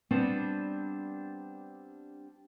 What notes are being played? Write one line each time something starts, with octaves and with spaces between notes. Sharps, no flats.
G3 B3 C4 D4 G4